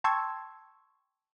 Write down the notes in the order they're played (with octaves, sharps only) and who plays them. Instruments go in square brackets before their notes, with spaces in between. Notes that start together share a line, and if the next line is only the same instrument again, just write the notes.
[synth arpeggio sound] G5 A5 C6 C#6 E6 G#6